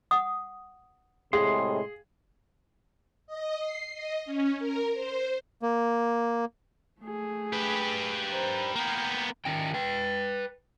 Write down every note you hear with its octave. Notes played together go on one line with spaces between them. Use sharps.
F#5 D#6
A2 C3 G#3 G#4 F5 G5 C6
D#5
C7
D#5
C#4
A#4
C5
A#3
A3 G#4
G4 B4
A#4 C5
A#3 B3 A#4 G5
D#3 C#4 G5
B4 G5